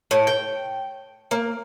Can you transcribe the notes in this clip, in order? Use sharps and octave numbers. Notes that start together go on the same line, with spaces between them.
A2
G5
A#3